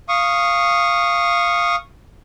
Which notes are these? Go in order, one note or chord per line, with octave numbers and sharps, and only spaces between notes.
F5 C#6 D#6